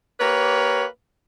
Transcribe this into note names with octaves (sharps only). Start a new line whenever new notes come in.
A#3 G4 B4 C#5